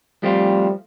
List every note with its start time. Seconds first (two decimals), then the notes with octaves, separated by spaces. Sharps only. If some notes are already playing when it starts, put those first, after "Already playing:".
0.23 F3 G3 A3 C4 F4